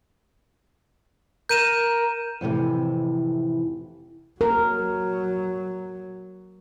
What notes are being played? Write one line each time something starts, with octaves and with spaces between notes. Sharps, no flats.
A#4 G6 D#7 E7
F2 A2 C3 E3
F#3 A#4